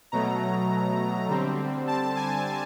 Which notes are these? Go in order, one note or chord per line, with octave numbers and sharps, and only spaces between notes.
B2 F#3 A3 A#5
D3 G3 C4
A5
G#5